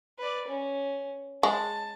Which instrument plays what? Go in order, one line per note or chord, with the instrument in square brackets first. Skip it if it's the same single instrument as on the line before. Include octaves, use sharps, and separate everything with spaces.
[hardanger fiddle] B4 D5
C#4
[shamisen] G#3 [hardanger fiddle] A5